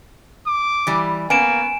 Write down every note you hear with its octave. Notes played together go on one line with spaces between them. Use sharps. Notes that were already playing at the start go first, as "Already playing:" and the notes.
D6
E3 G3
A#3 B3 C#4 G#5 D7 E7